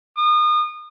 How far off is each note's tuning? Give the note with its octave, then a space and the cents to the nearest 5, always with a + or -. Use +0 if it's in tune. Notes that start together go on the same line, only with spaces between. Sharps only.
D#6 -30